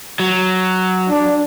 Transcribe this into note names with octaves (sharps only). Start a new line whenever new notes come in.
F#3
D4